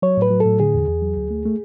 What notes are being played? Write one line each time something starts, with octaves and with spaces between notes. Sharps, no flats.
F#3 C#5
A2 B4
F#3
A4
A2
D3 G#4
E2
E2
F#3
D2
A3
A3